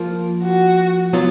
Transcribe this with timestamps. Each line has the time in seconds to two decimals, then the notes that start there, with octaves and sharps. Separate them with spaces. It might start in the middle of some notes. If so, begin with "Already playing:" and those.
Already playing: F3 A#3 F4
0.44 F#4
1.13 F#3 B3 F4